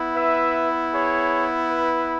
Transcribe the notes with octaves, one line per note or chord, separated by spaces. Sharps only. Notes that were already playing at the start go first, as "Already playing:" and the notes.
Already playing: B3 E4
B4 E5
G#4 C#5
B4